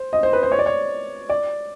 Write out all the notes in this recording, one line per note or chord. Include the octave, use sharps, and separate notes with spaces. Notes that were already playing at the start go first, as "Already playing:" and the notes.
Already playing: C5
D#5
C5
B4
C5
C#5
D5
C#5
D5